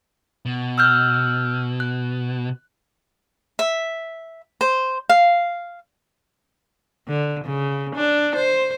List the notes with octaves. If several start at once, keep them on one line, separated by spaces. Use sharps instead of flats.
B2
E6 F6 G6
F#6
E5
C5
F5
D3
C#3
D4
C5